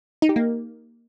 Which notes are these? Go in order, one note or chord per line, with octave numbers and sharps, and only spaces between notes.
D#4
G4
A#3